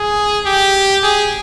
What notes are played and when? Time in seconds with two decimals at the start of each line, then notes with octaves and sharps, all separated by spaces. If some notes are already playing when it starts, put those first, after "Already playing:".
Already playing: G#4
0.46 G4
1.03 G#4